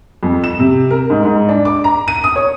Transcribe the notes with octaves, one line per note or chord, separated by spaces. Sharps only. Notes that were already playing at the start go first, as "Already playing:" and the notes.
F2
E7
C3
A#4
G#2
G#2
D4
D6
A#5
D#7
D#6
C#5